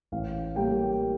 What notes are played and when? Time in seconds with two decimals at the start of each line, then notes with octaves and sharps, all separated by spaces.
0.12 A1 F5
0.55 A2 G3 A#3 G5